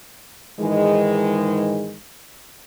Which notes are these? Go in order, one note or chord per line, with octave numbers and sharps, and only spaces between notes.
G#2 D#3 E3 G#3